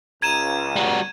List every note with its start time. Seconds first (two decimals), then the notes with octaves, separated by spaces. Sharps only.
0.22 C#2 A#5 G#6 D#7 E7
0.76 G3 F#4